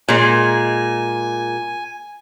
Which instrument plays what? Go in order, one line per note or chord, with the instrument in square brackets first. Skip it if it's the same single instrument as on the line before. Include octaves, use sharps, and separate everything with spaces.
[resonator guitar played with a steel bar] A#2 G#3 [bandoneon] G#5